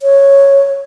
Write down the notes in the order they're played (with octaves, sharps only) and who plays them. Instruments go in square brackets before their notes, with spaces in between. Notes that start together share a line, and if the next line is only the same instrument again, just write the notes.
[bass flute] C#5